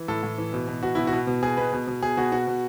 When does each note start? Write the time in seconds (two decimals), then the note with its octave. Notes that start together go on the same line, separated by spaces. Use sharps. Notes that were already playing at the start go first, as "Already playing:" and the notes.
Already playing: E3
0.08 A2 A4
0.23 A2
0.38 E3
0.53 B2
0.68 B2
0.82 B2 F#4
0.95 B2 E4
1.07 F#4
1.13 B2
1.27 B2
1.42 B2 G#4
1.57 B2 B4
1.73 B2
1.87 B2
2.03 B2 G#4
2.17 B2 F#4
2.32 B2 F#4
2.47 B2